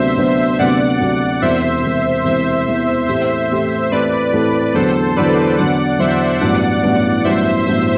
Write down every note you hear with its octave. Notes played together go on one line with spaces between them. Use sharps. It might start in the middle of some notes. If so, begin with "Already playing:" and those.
Already playing: D2 C3 F#3 B3 D4 C5 E5
D2 C3 F#3 B3 D4
D2 C3 F#3 B3 D4 D5 F#5
D2 C3 F#3 B3 D4
E1 E2 C3 C5 E5
E1 E2 C3
E1 E2 C3 C5 E5
E1 E2 C3
A2 E3 A3 C4 G4 C5 E5
A2 E3 A3 C4 G4
A2 E3 A3 C4 G4 B4 D5
A2 E3 A3 C4 G4
E2 D3 F#3 A4 C5
E2 D3 F#3 B4 D5
E2 D3 F#3 D5 F#5
E2 D3 F#3 C5 E5
A1 G2 F#3 B3 E4 D5 F#5
A1 G2 F#3 B3 E4
A1 G2 F#3 B3 E4 C5 E5
A1 G2 F#3 B3 E4 C5 E5